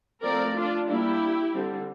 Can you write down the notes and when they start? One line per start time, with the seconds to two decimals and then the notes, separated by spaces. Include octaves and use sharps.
0.23 F3 A3 C4 A#4 D5
0.56 D4 F4
0.87 G3 A#3 D4 E4 G4
1.54 D3 G3 C4